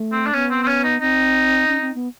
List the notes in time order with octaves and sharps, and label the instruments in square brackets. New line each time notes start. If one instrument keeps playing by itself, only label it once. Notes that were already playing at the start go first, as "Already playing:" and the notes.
Already playing: [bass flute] A3
[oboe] C4
D4
[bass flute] B3 [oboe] C#4
[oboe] C4
C4
C#4
D#4
[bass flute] C4 [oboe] D#4
[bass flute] C#4
C4
B3